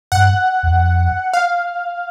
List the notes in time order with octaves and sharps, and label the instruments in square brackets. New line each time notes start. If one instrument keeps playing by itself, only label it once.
[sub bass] G2 [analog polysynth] F#5
[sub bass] E2
F2
[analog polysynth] F5